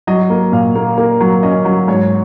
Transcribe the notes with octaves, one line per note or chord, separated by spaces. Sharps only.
F#3 D#5
A#3
A#2 F5
A#3
A#3
F#3
C#4 D#5
F#3
G#2 C#5